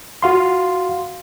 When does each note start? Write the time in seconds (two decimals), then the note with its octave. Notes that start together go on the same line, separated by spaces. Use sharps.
0.22 F#4 F5 C6